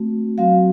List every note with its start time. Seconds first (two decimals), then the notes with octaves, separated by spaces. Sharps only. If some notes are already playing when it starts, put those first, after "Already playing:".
Already playing: A3 C4 F#4
0.38 F#3 C4 F#4 F5